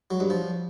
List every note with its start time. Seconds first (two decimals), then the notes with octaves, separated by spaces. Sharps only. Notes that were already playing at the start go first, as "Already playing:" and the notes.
0.10 F#3
0.20 G2
0.30 F3